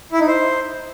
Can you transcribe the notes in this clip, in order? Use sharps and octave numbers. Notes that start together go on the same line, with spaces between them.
E4
D#4
C5